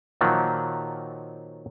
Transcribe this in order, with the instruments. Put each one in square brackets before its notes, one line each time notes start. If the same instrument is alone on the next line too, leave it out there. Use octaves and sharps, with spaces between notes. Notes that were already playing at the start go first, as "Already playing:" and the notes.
[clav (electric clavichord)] A#2 D#3 F3 F#3